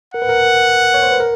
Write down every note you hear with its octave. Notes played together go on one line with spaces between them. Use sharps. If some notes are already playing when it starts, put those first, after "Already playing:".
A#4 F#5
B4
A#4
C#5
C5
B4
A#4